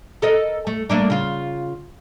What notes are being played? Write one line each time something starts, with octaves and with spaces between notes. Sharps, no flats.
A4 A#4 D#5
A3
A3 A#3 D4
C#3 F4